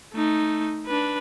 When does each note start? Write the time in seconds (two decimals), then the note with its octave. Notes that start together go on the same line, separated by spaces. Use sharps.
0.14 A3 D#4
0.86 D4 B4